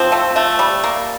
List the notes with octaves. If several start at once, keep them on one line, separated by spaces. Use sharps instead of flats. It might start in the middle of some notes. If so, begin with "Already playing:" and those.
Already playing: F3 C4
A3
A3
G3
A#3